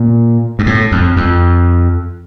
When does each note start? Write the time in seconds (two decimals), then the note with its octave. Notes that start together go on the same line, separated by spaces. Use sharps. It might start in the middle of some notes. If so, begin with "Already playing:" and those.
Already playing: A#2
0.59 G2
0.66 A2
0.92 F2
1.17 F2